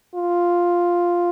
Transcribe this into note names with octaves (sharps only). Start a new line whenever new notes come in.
F4